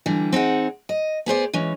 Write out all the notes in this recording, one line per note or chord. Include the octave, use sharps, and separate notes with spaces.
D3 E3 G3
C4 D#4 G#4 F#5
D#5
B3 G#4 C5 D5
E3 G#3 C#4